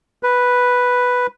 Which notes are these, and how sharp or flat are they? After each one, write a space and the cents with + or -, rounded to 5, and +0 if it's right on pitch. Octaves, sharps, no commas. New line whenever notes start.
B4 +0